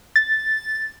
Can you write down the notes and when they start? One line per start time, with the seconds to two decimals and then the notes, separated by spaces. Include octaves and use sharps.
0.16 A6